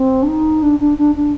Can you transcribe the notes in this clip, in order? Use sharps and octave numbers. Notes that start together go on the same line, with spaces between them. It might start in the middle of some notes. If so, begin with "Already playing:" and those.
Already playing: C4
D4
D#4
D4
D4
D4
D4